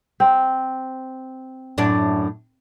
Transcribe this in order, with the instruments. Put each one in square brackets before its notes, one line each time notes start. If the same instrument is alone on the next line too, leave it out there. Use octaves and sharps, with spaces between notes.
[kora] C4
[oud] F#2 A2 D4